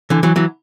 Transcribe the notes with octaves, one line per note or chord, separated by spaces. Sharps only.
D3 E3
E3 F#3
E3 F#3